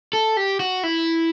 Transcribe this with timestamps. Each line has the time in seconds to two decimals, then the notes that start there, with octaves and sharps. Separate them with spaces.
0.13 A4
0.37 G4
0.60 F#4
0.83 E4